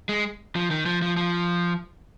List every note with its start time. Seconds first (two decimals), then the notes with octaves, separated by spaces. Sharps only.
0.09 G#3
0.56 F3
0.71 D#3
0.86 F3
1.02 F3
1.17 F3